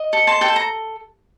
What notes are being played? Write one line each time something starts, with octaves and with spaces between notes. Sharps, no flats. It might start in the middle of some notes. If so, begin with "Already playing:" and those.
Already playing: D#5
A4
A5 C6
A4 G5
A5
A#5